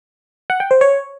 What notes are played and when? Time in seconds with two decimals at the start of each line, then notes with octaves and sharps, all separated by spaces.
0.50 F#5
0.60 G5
0.71 C5
0.81 C#5